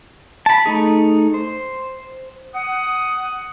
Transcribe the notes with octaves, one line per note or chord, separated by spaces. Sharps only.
A5 B5
A3 D#4 G#4
C5
F#5 D#6